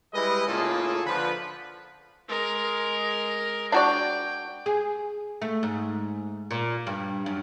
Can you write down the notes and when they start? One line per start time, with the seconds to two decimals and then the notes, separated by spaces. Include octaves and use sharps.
0.14 G3 G#3 E4 B4 D#5
0.48 A2 C#3 A#3 F4 G#4 A4
1.06 D3 F3 B4
2.28 G#3 A#4
3.72 D4 F#4 D5 G5
4.66 G#4
5.42 A3
5.63 G#2
6.51 A#2
6.87 G2
7.26 F#2